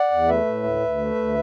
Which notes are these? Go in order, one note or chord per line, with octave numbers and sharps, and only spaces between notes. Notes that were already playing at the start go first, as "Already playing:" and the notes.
Already playing: D5 F#5
E2
A3 B4 E5
A2
D2
D2
A3
D2